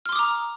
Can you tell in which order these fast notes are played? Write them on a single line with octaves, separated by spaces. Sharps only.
F6 C6 D6 D#6 A#5